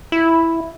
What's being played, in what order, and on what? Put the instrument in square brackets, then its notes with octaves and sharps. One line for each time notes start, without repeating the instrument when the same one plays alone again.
[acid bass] E4